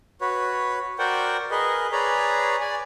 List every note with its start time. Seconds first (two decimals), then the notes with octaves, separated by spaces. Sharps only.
0.21 F#4 B4 C#5
0.99 F#4 A#4 C5 D5 F#5 G5
1.51 G#4 A#4 B4 D#5
1.92 G#4 B4 C#5 D5 A#5
2.61 D5 G#5